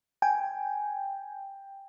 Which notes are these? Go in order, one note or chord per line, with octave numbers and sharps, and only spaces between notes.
G5 G#5